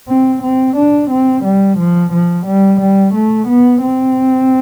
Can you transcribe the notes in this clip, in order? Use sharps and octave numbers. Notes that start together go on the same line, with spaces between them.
C4
C4
D4
C4
G3
F3
F3
G3
G3
A3
B3
C4